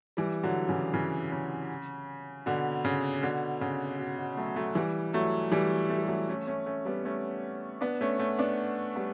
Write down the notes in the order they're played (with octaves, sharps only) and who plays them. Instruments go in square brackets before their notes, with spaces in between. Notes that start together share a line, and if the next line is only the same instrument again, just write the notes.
[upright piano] E3 G3
D3 F#3
C#3 E3
C#3 E3
C#3
B2 D3
C#3
B2 D3
C#3
B2
B2
F#3 A3
F#3 A3
E3 G3
F#3 A3
E3 G3
A3
G3
F#3 A3
A3 C#4
A3 C#4
A3 C#4
G3 B3
A3 C#4
B3 D4
A3 C#4
A3 C#4
B3 D4
G3 B3